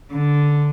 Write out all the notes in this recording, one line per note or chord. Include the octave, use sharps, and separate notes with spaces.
D3